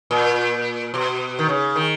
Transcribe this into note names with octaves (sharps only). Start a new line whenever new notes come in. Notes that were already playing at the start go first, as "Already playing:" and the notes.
A#2
B2
D#3
C#3
D#3